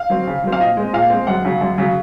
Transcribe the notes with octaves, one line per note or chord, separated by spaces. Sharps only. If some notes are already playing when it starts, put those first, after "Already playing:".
Already playing: F5
F#3 C4
C#3
F#3 C4
F5
A#2 D#5
G#3 C4
A#2 F5
G#3 C4
F#2 F#5
C#3 F#3
F#2
C#3 F#3